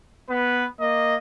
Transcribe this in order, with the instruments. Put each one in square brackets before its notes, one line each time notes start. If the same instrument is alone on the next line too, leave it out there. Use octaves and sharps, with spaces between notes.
[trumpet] B3 [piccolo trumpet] B4
[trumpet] A#3 [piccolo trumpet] D#5